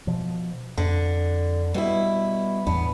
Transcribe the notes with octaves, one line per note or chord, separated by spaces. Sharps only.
B2 F3
F2 D3
B2 G3 E4
E2 A2 B3 D4